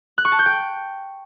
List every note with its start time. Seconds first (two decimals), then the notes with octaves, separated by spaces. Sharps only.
0.18 F#6
0.25 C#6
0.32 A5
0.39 G6
0.46 G5